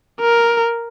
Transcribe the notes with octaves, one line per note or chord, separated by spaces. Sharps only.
A#4